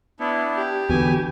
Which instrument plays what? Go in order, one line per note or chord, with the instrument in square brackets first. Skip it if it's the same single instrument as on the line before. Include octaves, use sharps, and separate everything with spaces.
[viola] B3 [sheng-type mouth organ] D4 E4
[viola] G4
[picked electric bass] E2 D3 [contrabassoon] B2 [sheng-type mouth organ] G#5